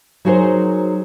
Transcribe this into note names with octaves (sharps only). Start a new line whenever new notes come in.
F#3 D#4 F#4 G#4 A#4 C5